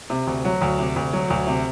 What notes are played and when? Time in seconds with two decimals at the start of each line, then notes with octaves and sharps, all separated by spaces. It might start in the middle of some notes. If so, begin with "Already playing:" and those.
0.10 C3
0.27 D2
0.45 F#3
0.61 D2
0.79 C3
0.96 D2
1.13 F#3
1.30 D2
1.47 C3